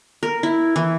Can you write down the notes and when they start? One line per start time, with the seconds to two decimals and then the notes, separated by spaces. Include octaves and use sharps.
0.23 A#4
0.43 E4
0.76 E3